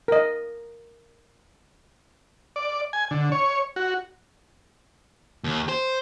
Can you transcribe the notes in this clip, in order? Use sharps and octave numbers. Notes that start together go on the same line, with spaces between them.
A#4 D#5
D5
G#5
D3
C#5
F#4
D#2
C5